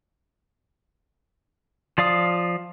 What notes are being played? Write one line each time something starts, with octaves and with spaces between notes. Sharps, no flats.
F3 D5 F5 D#6